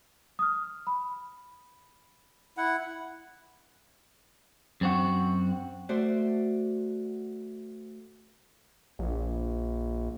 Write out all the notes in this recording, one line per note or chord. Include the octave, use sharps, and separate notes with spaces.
D#6 F6
B5
E4 F#5
F#2 C4 F#4
A3 F#4 C5 D5
A#1